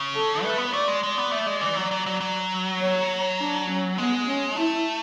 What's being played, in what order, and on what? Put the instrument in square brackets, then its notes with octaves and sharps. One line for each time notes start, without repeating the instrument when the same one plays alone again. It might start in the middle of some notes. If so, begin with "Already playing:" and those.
Already playing: [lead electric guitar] C#3
[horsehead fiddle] A4
[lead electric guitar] A3 [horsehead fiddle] B4
[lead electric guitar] B3
[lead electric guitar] A3 [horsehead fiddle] D5
[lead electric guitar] G#3
[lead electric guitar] G#3 [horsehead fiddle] D5
[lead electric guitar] B3
A3
G#3
E3
F#3
F#3
F#3
F#3
[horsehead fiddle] C#5
D4
C#4
[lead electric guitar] G#3 [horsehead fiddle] B3
[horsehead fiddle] C#4
[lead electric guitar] A3 [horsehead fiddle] E4